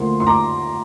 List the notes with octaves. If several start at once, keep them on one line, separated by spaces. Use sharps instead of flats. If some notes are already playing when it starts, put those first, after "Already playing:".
Already playing: D2 D3 F3 A#3 C6
C6
A#5 D6